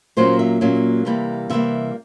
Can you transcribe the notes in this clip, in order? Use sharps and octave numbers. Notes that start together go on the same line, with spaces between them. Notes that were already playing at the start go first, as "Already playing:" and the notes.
A#2 F#3 A#3 C#4 C5
E5
A#2 F#3 A#3 C#4
C3 E3 G3 A#3
C3 E3 G3 A#3 E5